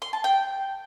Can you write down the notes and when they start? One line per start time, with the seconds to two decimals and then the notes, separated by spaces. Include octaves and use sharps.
0.02 C6
0.13 A5
0.24 G5